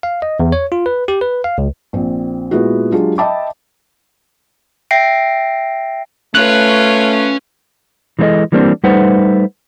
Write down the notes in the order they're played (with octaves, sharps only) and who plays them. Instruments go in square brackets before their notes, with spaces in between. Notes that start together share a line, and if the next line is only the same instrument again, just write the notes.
[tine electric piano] F5
D#5
E2
C#5
F4
B4
G4
B4
F5
C#2
[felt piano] A#1 C4
A#2 G#3 B3 E4 F#4
F#3 G#3 D4 F4 G4 G#4
D#5 E5 G5 A5 B5 D6
[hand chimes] E5 G5 A#6 C7 D7
[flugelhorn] A3 [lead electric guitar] C#4 C#5 [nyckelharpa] F4 B4 [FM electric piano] F#6
[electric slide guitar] E3 G#3 A3 D#4 A4 D#5
E3 G3 A#3 C4 D4
G3 A3 D#4 B4 C5 F#5